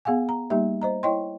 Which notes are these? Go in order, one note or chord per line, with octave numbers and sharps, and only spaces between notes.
B3 G#4 F5 F#5 G#5
A#5
G3 A#3 D#4 G4 E5
C5 D#5 A#5
E4 C#5 D#5 G5 C6